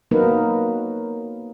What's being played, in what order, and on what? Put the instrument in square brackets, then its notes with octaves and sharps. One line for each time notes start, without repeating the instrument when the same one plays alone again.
[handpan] F#3 A#3 B3 D#4 A#4 B4